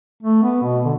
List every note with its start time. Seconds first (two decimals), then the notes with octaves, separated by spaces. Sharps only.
0.23 A3
0.43 B3
0.63 B2
0.85 D3